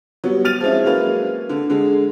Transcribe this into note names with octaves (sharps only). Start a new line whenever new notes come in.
F#3 G3 B3
F6 A6 D#7 F7
F3 G#3 C4 C#4 E4
F#3 G#3 A#3 C#4 B4 F7
D3
D3 G#3